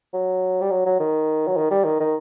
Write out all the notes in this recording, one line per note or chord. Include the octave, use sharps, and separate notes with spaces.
F#3
G3
F#3
F#3
D#3
F#3
D#3
G3
D#3
D#3